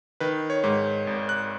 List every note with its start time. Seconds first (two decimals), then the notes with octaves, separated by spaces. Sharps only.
0.20 D#3 B4
0.50 C#5
0.64 G#2
1.07 G#1
1.29 F#6